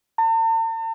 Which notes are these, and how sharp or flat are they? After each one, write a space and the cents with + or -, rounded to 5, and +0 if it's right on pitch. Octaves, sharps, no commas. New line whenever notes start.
A5 +45